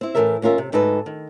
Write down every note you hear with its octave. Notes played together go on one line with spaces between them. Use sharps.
C4 E4
A2 E3 F#3 A4 A#4 E5
D#2 C#4 F4 A#4 E5
C3
D2 G#2 D#4 A4 B4
D#3